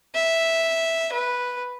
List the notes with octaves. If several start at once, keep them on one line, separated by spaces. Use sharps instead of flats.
E5
B4